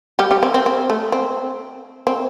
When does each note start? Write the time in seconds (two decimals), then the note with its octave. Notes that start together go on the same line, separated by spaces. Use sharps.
0.19 G3 G4
0.31 G3 G4
0.43 C4
0.54 C4
0.66 C4
0.90 A3
1.12 C4
2.07 C4